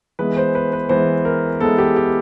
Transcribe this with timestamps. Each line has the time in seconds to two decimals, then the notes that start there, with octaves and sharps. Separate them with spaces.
0.19 E3 G#3 B3 B4
0.37 C5
0.55 B4
0.73 B4
0.89 E3 G#3 B3 C5
1.25 A#4
1.60 E3 G#3 B3 A4
1.78 G4
1.96 G4